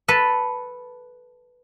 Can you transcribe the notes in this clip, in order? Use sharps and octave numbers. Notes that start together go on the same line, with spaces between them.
A4 B4